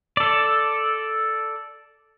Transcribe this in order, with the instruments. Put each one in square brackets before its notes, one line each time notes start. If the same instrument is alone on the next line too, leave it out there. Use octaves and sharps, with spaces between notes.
[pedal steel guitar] A4 D5